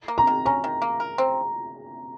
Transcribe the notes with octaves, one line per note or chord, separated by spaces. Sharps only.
A#3
A#5
D#3
C#4 A#5
D#3
A#3
A#4
C4